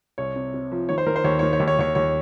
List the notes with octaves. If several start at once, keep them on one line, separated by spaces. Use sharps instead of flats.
C2 C#5
C3
C3
F3
D#3 C#5
C5
D#3 A#4
C5
D#2 C#5
C#5
D#3
C#5
D#2
C#5
D#2 C#5
D#2 C#5